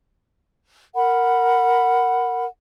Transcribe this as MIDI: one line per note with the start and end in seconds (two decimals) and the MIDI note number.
0.95 2.45 70
0.95 2.45 78
0.95 2.45 83